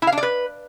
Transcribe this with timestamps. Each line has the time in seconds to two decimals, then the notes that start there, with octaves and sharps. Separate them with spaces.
0.02 E4
0.07 F5
0.12 D4
0.18 D5
0.23 B4